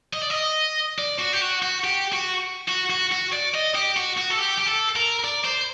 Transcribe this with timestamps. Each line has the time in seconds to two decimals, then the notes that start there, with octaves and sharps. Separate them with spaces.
0.13 D#5
0.22 D5
0.30 D#5
0.99 D5
1.19 F#4
1.33 G4
1.42 F#4
1.62 F#4
1.84 G4
2.12 F#4
2.69 F#4
2.90 F#4
3.12 F#4
3.33 D5
3.54 D#5
3.75 G4
3.97 F#4
4.18 F#4
4.31 A4
4.39 G4
4.58 G4
4.67 A4
4.96 A#4
5.24 D5
5.45 C5